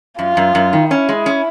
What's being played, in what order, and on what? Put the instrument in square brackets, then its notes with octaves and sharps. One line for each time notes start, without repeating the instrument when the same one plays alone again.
[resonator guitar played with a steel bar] F#2 [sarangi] F4
[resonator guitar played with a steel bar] F#2
F#2
D#3
[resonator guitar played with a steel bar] C#4 [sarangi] E4
[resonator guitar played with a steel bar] G#3
C#4